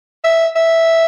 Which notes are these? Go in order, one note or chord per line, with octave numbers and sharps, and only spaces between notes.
E5
E5